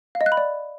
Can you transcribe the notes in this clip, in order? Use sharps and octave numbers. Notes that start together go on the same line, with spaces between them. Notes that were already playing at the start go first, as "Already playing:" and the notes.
F5
D#5
F#6
B5
D5